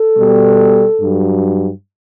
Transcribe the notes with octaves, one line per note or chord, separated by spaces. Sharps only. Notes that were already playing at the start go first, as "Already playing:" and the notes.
Already playing: A4
B2 G3
G2 F#3